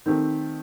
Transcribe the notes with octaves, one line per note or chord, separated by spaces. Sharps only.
D#3 A3 C4 G4